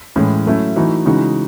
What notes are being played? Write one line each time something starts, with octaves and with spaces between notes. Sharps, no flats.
A2 E3 G#3 C#4
F#3 A3 C#4 E4
E3 A3 D#4 F#4
C#3 E3 G#3 D#4 F#4